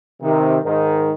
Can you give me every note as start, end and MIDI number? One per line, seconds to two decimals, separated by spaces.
0.22 0.58 48
0.22 0.58 51
0.64 1.12 44
0.64 1.12 51